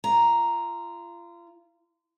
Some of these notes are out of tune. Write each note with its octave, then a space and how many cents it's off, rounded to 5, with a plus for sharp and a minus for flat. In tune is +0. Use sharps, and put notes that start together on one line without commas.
F4 -30 A#5 +0